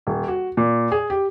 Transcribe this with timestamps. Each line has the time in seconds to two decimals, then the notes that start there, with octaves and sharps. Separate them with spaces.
0.07 D#1
0.28 F#4
0.57 A#2
0.92 G#4
1.10 G4